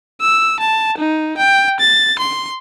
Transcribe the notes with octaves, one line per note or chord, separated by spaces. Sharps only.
E6
A5
D#4
G5
A6
C6